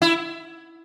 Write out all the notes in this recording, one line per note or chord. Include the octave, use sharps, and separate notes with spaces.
E4